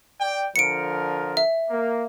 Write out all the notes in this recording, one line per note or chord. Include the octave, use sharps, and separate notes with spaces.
D5 G5
D3 F3 A#4 C#7 D7
E5
A#3